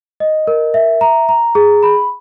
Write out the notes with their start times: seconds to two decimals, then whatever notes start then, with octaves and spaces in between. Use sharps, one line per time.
0.20 D#5
0.47 A#4
0.74 E5
1.01 A#5
1.29 A#5
1.55 G#4
1.83 B5